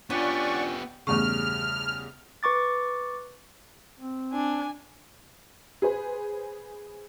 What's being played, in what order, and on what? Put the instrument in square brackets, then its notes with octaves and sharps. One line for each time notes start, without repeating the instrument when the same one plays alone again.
[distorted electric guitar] B3 G4 [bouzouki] C#4 [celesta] D4 F4 [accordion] D5 F#5 C#6
[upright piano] E2 G2 C#3 [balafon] A3 C#6 [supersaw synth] F6
[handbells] B4 C#6 D6 A6
[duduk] C4
[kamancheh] D4 [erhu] G#5
[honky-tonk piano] G#4 B4 C5